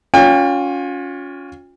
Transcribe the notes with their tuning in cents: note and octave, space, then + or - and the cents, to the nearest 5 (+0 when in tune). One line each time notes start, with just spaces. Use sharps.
C#4 +20 F4 +40 G5 +45